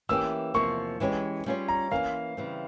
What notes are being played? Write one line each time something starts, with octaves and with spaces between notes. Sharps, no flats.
E3 A#3 C#4 G4 E6
E2 C3 F3 A#3 C#6
E3 G#3 C#4 G4 C#5
G3 C#4 F4 G#4 C#5
A#5
E3 A#3 C#4 F5
C#3 E3 G3 C4